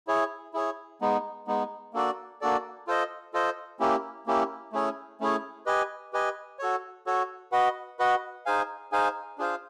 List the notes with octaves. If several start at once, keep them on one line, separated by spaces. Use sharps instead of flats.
E4 G#4 C#5
E4 G#4 C#5
G#3 B3 D#4
G#3 B3 D#4
A#3 D4 F#4 A4 D5
A#3 D4 F#4 A4 D5
F4 A4 C5 D#5
F4 A4 C5 D#5
A#3 C#4 E4 G4
A#3 C#4 E4 G4
A3 C#4 E4 G#4 C#5
A3 C#4 E4 G#4 C#5
G4 B4 D#5 G#5
G4 B4 D#5 G#5
F#4 A4 C#5
F#4 A4 C#5
F#4 B4 D#5 F#5
F#4 B4 D#5 F#5
D#4 G#4 C5 F5 G#5
D#4 G#4 C5 F5 G#5
D4 F4 G#4 C5 F5